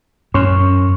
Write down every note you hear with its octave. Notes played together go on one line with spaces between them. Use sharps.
F#2 C#4 C6 C#6